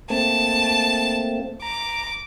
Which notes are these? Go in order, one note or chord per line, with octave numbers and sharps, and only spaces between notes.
A3 A#3 C4 A5
A#5 D6